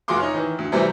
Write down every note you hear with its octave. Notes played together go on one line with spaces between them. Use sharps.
F1 F4 F#4 G#4 C6 D6
D#4 C#5
D#3 E3
D2
C3 E3 F#3 G3 A3 C4